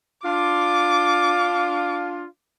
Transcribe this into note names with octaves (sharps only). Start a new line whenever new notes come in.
D4 F4 D6